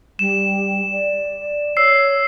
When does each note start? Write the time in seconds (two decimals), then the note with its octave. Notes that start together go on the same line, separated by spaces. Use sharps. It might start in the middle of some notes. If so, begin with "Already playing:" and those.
0.19 G3 E7
0.92 D5
1.77 C#5 E6 C7